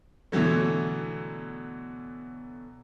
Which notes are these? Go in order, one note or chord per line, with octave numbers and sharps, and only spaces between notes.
B2 D3 E3 F#3 A3